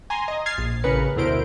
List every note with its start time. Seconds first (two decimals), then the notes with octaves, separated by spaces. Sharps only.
0.10 G#5 A#5 C6
0.28 D#5
0.46 F6 G#6 A6 C7
0.58 A#1
0.84 A1 C#3 A#4 B4 C#7
1.16 D2 B2 E4 A#4 C5 D7